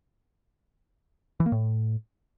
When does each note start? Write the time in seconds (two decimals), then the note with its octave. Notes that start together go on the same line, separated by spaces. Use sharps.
1.40 E3
1.46 A#3
1.52 A2